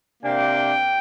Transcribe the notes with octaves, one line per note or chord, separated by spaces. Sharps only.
C3 A#3 D4 G5